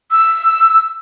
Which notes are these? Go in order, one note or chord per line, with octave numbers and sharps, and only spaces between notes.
E6